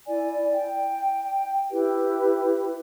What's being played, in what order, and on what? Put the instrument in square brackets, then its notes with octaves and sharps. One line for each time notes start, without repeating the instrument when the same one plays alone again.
[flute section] E4 D5 G#5
G5
E4 G4 B4